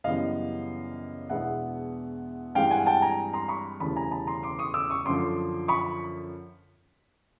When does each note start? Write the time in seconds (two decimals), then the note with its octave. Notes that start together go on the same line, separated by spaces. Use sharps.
0.04 F#2 C#3 E3 G3 B3 D#5 F5
1.29 E2 B2 G#3 B3 D4 E5 F#5
2.55 G2 E3 G#3 C4 F5 G5
2.71 F#5 G#5
2.86 G5 A5
3.02 G#5 A#5
3.33 A#5 C6
3.49 B5 C#6
3.80 E1 D2 C#3 E3 G3 A5 B5
3.96 G#5 A#5
4.11 A5 B5
4.27 A#5 C6
4.43 C6 D6
4.59 C#6 D#6
4.74 D6 E6
4.90 C#6 D#6
5.05 F#2 D3 F3 C6 D6
5.68 B5 C#6